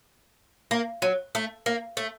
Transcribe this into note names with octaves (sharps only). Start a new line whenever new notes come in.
A#3
F#3
A3
A#3
A3